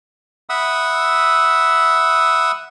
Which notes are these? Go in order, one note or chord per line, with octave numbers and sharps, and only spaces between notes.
E5 F#5 B5 D#6 E6